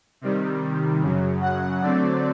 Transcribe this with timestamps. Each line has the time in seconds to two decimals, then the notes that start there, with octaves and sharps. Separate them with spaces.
0.21 C3 D#3 G3
1.02 F#2 C#3 F#3
1.41 F#5
1.82 D3 F#3 A3 C4 D5